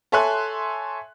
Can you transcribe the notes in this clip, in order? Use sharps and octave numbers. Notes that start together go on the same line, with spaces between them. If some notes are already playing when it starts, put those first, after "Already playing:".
A4 C#5 E5 G#5 C6 F#6